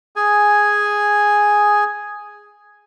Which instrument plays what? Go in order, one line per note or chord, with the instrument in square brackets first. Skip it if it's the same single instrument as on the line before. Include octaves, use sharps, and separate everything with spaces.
[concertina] G#4 G#5